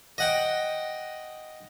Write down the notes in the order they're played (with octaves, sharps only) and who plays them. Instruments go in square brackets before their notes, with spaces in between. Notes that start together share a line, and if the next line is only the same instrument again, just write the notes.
[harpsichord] D#5 F#5 G5